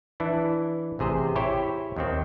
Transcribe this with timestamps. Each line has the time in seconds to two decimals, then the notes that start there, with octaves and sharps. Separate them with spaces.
0.20 E3 D4 E4
0.99 A1 C3 G#4 C5
1.36 E4 G4 C5 C#5 G5
1.96 D#2 D#3 C4